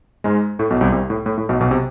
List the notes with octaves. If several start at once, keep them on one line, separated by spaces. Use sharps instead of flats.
G#2 G#3
A2 A3
B1 B2
C2 C3
C2 C3
A2
A2
A2
B1 B2
B1 B2
C3